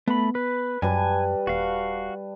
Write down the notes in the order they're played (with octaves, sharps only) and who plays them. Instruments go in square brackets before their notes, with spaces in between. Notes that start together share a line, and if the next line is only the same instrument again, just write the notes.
[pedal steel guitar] A3 B5 [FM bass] B3
[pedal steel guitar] B4
[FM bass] F#2 [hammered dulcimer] G3 B4 A5 [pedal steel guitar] G#5
[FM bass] D#1 [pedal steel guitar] F#4 F5